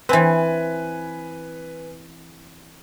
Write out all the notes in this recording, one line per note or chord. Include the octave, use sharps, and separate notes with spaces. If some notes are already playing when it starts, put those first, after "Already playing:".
E3 C4 B4 G#5